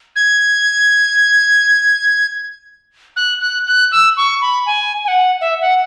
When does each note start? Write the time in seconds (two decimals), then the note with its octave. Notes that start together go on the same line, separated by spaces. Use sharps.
0.16 G#6
3.16 F#6
3.41 F#6
3.67 F#6
3.92 E6
4.17 C#6
4.42 B5
4.66 G#5
5.05 G#5
5.08 F#5
5.41 E5
5.61 F#5